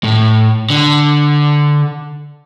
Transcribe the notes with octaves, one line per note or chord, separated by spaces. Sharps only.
A2
D3